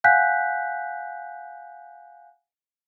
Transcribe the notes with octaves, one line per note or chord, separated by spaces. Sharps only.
F5 F#5 G#5 F#6 G6 B6